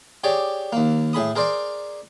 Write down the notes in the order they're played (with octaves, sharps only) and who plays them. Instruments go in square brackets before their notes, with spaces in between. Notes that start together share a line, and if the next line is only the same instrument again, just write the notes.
[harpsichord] G4 G#4 C#5 D5
D#2 A#3
A2 G#4 B5 D#6
G#4 A#4 C5 D5